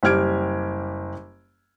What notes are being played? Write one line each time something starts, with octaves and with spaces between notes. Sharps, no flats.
F#1 G3 G4 F6 G#6 D7